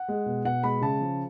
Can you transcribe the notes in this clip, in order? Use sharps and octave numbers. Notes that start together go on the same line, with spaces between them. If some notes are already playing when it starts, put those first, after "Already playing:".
Already playing: F#5
G#3
B2
B2 F#5
G#3 B5
C#3 A5
F3